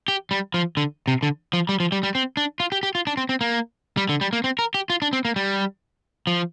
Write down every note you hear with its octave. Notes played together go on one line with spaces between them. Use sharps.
G4
G3
F3
D3
C3
D3
F3
G3
F3
G3
G3
C4
D4
F4
G4
G4
F4
D4
C4
C4
A#3
G3
D3
G3
A#3
C4
A#4
G4
F4
D4
C4
A#3
G3
F3